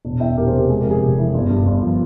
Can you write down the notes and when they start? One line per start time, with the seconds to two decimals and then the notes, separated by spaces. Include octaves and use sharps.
0.05 E1
0.20 E2 E5 G5
0.37 E1 G4 A#4
0.47 G#4 C5
0.53 C3
0.58 G4 A#4
0.69 G#3 G#4
0.79 G4 A#4
0.85 F2
0.91 G#4
1.01 F1 G4
1.18 E3
1.34 G1
1.50 G2
1.66 G1
1.83 F3